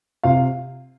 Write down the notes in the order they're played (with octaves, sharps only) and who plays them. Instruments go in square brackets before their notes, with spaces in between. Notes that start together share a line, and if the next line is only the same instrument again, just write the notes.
[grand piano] C3 F4 F5